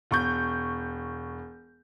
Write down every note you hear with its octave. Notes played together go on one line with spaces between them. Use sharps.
E1 C#6 G6